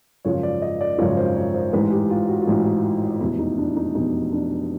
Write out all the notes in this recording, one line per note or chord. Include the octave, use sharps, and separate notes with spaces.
G#1 F#2 C#3 F3 C#5
D5
D#5
D5
G#1 F#2 C#3 F3 C#5
C5
C#5
C5
A1 G#2 E3 G#3 B4
G4
F4
F#4
F4
A1 G#2 E3 G#3
F#4
F1 E2 B2 E4
D#4
D4
D#4
F1 E2 B2 D#4
D4